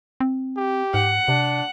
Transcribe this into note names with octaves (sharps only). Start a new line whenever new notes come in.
C4
G4
G#2 F#5
C3 D4